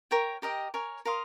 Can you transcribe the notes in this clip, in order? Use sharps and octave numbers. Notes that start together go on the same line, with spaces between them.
A#4 C#5 G5
G4 A#4 D#5 G5
A#4 C#5 G#5
A#4 F5 C6 D#6